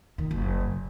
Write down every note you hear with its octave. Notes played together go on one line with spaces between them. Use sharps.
D#3
F#1
F#2